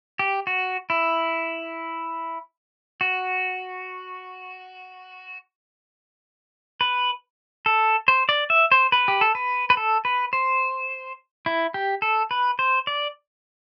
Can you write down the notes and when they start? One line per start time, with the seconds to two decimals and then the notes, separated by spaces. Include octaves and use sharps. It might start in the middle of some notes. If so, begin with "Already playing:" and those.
0.19 G4
0.47 F#4
0.90 E4
3.01 F#4
6.81 B4
7.66 A4
8.08 C5
8.29 D5
8.50 E5
8.72 C5
8.92 B4
9.08 G4
9.21 A4
9.35 B4
9.70 B4
9.77 A4
10.05 B4
10.33 C5
11.46 E4
11.74 G4
12.02 A4
12.31 B4
12.59 C5
12.87 D5